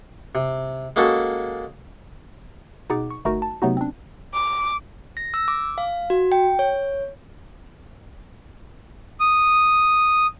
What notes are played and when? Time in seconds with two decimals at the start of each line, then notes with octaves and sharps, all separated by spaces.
0.35 C3
0.96 G#3 A#3 C#4 F#4 A4
2.90 B2 D#4 G#4 F#5 D6 A6
3.10 C#6
3.25 G1 A3 D#4 F#4 A#4 A#5
3.42 A5
3.62 C3 F#3 A3 B3 D#4 F#4
3.77 C4 D4
4.34 D6
5.17 A#6
5.34 E6
5.48 D6
5.78 F5
6.10 F#4
6.32 G5
6.59 C#5
9.20 D#6